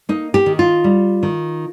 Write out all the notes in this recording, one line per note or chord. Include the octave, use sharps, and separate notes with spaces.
A#3 D#4
G4
D#3
F4
G3
D#3